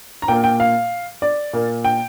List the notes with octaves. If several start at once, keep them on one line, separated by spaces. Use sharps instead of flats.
A#5
A#2 A#3 G5
G5
F5
D5
A#2 A#3
G5